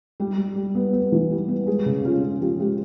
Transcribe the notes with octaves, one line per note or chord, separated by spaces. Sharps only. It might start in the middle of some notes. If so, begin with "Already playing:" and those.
G3 G4
G3
G3
B3
B3
E3
G3
B3
G#3 G#4
C#3
C#4 F4
C#4
F3 G4
G#3 G4